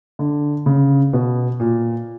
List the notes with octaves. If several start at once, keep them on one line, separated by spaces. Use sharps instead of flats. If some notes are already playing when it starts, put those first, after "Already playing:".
D3
C#3
B2
A#2